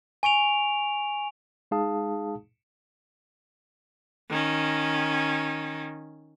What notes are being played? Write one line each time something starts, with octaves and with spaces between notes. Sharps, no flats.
G#5 C#6 D7 F7
G#3 D#4 G#4 F5 A5 D#6
D#3 C#4